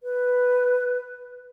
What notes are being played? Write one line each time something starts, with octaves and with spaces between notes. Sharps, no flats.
B4